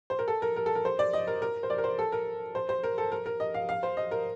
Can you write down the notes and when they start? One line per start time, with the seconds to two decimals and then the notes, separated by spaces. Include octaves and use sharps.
0.10 C5
0.19 A#4
0.28 A4
0.42 A#4
0.56 A#4
0.66 A4
0.75 A#4
0.85 C5
0.99 D5
1.13 D#5
1.27 A#4
1.42 A#4
1.63 C5
1.70 D5
1.78 A#4
1.84 C5
1.99 A4
2.12 A#4
2.55 C5
2.69 C5
2.84 A#4
2.98 A4
3.12 A#4
3.26 A#4
3.40 D#5
3.54 F5
3.69 F5
3.83 C5
3.97 D#5
4.11 A#4